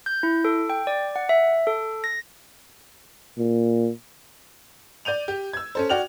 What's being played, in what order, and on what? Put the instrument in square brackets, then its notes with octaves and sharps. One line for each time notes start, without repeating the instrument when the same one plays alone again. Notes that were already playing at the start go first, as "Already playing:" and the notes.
[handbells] G6
E4
A4
G5
D5
F#5
E5
A4
A#6
[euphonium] A#2
[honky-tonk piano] D5 G6 D#7 F7
G4
E6 G#6
C#4 A4 C5
F#4 D5 G5 F6 F7